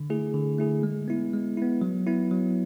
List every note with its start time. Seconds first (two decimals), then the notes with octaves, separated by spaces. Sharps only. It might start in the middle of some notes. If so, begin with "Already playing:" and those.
Already playing: D3
0.10 A3 E4 G#4
0.34 D3
0.58 A3 E4 G#4
0.83 G#3
1.08 B3 E4
1.33 G#3
1.57 B3 E4
1.81 F#3
2.07 B3 E4
2.31 F#3